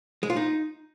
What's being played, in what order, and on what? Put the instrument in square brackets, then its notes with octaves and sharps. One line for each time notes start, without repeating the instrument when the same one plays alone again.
[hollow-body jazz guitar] G#3
F4
D#4